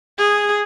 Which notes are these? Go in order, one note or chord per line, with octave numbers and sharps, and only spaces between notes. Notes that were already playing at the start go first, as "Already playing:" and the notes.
G#4